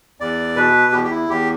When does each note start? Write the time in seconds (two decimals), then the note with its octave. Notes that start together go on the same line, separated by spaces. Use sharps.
0.20 E2 D5
0.56 B2 B4
0.92 E2 G4
1.04 G4
1.11 E4
1.29 E2 G4